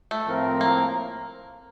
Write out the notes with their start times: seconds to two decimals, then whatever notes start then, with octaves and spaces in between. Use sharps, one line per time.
0.11 A3
0.27 A2 F3 C4 F4 A#4
0.61 A#3